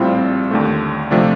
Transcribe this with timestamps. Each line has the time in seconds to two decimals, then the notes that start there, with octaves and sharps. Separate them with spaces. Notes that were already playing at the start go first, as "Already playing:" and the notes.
Already playing: A#1 A2 G3 C4 F4
0.51 D#2 D3 A3
1.11 C3 F3 A3 D4